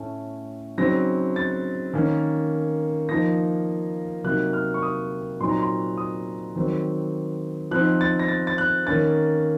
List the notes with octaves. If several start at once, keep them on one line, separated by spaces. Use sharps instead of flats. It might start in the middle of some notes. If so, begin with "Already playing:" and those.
Already playing: A2 A3 C#4
C#3 F#3 C4 D#4 A#6
A6
D#3 A#3 C#4
F3 A#3 D#4 A#6
C3 F#3 A#3 D#4 F#6
F6
C#6
D#6
A#2 F#3 C4 D#4 C6
A#5
C6
D#6
D#3 F#3 C4
F3 C4 D#4 F#6
A6
A#6
A6
A6
F#6
D#3 A#3 C#4 A6